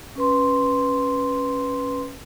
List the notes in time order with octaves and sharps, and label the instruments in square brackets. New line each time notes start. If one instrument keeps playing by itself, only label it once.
[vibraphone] C#4 B4 C6